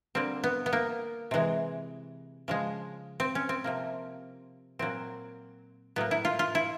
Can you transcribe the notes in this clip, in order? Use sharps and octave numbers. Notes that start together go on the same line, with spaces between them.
D3 G3 A#3 C4
B3
B3
A#3
C3 E3 G#3
C#3 F3 G#3
C4
C#4
C4
C3 F3 A#3
A#2 F#3 A#3 C4
A2 F#3 A#3 B3
E4
F4
F4
E4